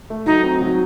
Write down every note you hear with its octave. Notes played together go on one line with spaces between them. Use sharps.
A3
F#3 D#4
C4
F#3